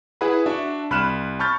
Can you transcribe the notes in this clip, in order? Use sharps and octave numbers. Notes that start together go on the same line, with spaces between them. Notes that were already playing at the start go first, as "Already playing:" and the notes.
E4 G#4 B4 E5 F#5 B5
D4 F#4 E5
C2 B5 F6 F#6 E7
A5 B5 C#6 F6 G6 A6